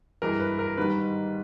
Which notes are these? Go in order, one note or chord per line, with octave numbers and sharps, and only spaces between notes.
G2 E3 G#3 A#4
B4
A#4
G#2 D#3 G3 B4